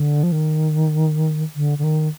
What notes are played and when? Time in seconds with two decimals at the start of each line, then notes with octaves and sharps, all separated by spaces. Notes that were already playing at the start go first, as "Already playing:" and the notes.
Already playing: D3
0.23 F3
0.32 D#3
1.56 D3
1.79 D3
1.84 D#3